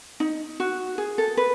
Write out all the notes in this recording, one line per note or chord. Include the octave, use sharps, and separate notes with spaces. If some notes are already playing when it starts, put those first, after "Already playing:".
D#4
F#4
G#4
A4
B4